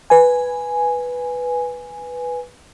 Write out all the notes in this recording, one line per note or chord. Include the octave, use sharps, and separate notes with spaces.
B4 G#5